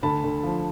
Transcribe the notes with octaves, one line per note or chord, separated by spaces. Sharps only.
D2 A5 B5
D2
F3